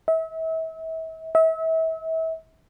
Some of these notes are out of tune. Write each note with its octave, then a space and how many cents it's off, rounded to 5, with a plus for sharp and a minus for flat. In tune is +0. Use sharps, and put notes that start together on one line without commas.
E5 -35
E5 -35